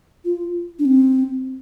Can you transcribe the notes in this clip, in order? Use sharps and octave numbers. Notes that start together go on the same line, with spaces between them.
F4
D4
C4